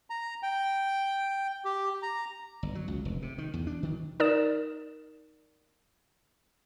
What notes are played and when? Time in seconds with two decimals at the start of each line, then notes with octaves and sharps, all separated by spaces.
0.10 A#5
0.43 G5
1.65 G4
2.03 A#5
2.63 G1
2.75 F#3
2.88 C#2
3.05 F1
3.22 C3
3.38 D#3
3.54 E2
3.67 D4
3.83 D#3
4.20 D#4 A#4 D5 D#6 E7